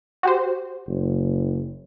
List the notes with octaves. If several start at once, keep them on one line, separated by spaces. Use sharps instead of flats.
F#4 G4 C5
F#1